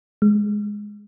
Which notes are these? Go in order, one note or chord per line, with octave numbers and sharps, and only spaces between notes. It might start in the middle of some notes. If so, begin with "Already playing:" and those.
G#3